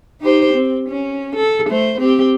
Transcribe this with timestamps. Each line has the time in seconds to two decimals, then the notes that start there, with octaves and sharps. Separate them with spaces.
0.21 D#4 G4 C5
0.54 C4
0.89 C#4
1.36 A4
1.69 A3 C5
2.00 C4 G4